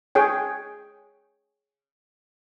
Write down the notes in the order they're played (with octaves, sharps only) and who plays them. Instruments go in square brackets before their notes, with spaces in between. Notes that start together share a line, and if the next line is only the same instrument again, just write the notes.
[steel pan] G#4 C#5 G5